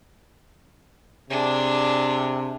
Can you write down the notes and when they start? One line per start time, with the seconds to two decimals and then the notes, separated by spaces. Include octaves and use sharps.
1.30 C3 D4 G#4